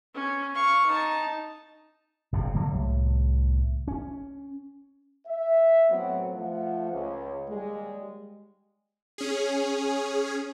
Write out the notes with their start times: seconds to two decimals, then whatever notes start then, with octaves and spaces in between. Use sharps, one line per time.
0.15 C#4
0.55 F5 C#6
0.87 D#4 A5
2.33 F#1 A2 C3
2.55 D3 F#3 A#3
2.71 C2 A2
3.88 C#4
5.27 E5
5.89 A2 F#3 B3 C4 F#5
6.33 F3 A3 F#5
6.92 C#2
7.48 D#2 G3 G#3
9.18 C#4 G#4